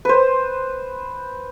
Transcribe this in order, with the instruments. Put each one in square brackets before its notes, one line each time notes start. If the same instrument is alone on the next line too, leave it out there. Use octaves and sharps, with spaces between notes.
[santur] B4 C5